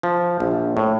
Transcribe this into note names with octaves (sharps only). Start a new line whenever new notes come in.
F3
A#1
A2